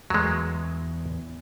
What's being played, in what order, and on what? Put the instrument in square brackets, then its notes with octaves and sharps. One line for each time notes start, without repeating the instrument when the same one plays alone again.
[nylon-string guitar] E2 [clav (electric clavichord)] F#3 G#3